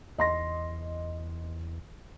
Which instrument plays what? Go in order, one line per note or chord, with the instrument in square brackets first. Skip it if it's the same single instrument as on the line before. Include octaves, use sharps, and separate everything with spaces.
[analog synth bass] E2 [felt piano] D#5 C6 A#6